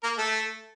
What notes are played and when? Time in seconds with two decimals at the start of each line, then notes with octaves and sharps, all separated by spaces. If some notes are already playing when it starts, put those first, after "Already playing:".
0.03 A#3 A#4
0.18 A3 A4